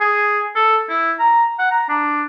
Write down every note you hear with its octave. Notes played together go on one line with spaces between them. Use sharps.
G#4
A4
E4
A#5
F#5
A#5
D4